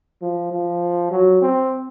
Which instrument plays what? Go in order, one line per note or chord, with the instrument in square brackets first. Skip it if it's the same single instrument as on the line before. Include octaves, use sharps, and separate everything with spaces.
[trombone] F3
F3
F#3
C4